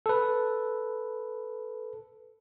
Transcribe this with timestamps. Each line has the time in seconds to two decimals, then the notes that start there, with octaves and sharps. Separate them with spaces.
0.06 A4 B4